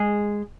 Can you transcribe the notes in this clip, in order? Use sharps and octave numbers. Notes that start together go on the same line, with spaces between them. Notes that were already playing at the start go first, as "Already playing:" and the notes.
Already playing: G#3 G#4